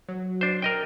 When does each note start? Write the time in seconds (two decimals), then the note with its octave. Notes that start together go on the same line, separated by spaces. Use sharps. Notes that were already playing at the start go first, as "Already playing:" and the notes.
0.08 F#3
0.41 D4 C5
0.62 A#4 D#5 G5